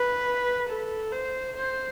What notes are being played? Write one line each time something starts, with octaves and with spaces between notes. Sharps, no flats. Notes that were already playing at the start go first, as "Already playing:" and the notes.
Already playing: B4
A4
C5
C5